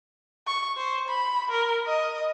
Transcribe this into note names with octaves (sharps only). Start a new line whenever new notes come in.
C#6
C5
B5
A#4
D#5